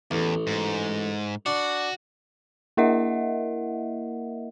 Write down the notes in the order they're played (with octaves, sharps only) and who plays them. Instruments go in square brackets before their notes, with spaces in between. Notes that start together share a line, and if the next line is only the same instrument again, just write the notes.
[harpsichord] A1 [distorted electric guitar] E2
[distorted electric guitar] G#2
[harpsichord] D4 [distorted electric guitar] F#4
[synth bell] A#3 E4 A#4 D#5 E5 F#5